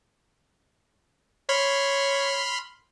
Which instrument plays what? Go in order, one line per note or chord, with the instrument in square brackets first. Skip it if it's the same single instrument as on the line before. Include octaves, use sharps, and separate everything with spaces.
[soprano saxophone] C#5 [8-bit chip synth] B5 C6 F6